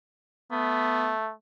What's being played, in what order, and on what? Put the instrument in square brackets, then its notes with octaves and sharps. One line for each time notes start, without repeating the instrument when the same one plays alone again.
[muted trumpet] A3 [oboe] B3